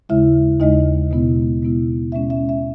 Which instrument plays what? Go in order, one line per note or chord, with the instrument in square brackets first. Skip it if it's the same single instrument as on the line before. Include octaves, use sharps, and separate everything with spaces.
[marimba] D#2 C#3 G#3 E4 E5
D#2 C#3 G#3 D#4 D#5
B2 G#3 B3 E4
B2 G#3 B3 E4
B2 G#3 C#4 E5
E5
E5